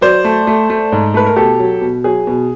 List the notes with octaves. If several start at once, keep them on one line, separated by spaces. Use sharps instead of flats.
F#3 C5 D5
A3
A3
A3
G#2
A3 B4
A#4
B2 G4 A4
F#3
B2
F#3 G#4
B2